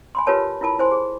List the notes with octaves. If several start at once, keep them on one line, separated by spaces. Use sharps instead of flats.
G#5 B5 C6
F4 G4 A#4 B4 C#5 A5
E4 F4 A#4 A5 B5
E4 C5 G#5 C6
G#4